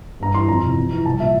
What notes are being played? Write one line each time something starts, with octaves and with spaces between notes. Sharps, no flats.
G2 A#5
E3 C6
F2 A#5
C3 E3
F2
E3
C2 A5
A#2 F3 E5